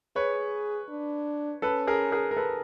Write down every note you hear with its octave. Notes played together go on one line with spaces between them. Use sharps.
G#4 B4 C#5
D4
C#4 A4 B4
G#4 A#4
G#4 A#4
A#4
A4 B4